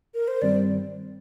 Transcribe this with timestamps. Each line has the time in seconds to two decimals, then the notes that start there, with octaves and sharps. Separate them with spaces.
0.15 A#4
0.28 C5
0.42 G2 D#3 G3 C4 D5